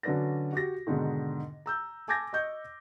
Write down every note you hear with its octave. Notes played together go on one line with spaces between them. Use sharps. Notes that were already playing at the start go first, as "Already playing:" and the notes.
D3 F#3 C#4 B4 D5 A#6
F#4 G4 A#6
G#2 B2 D3 D#3
A#5 E6 G6
G#5 A5 D6 G6 G#6 A#6
D#5 C#6 G6